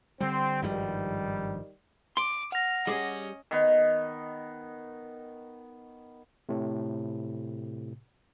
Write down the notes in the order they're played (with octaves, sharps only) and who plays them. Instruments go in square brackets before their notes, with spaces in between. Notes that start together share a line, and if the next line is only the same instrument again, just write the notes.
[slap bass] D3 G3 [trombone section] C4
[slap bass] G#1 G2 F3 [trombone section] D#3 G3
[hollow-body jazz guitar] C6 [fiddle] D6
[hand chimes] F#5 A#6 [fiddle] F6
[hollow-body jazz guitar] G3 G4 G#4 [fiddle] C#4 D#5
[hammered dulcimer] D#3 B3
[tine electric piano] A2 C3